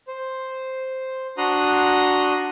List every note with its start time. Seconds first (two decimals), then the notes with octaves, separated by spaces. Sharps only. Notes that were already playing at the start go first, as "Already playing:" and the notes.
0.08 C5
1.38 D4 F#4 A#5 C6 D#6 F#6